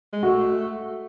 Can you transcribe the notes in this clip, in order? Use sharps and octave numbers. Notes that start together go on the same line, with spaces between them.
G#3
A3 F#4